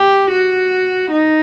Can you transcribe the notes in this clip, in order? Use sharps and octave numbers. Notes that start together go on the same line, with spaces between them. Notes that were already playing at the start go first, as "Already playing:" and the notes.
Already playing: G4
F#4
D#4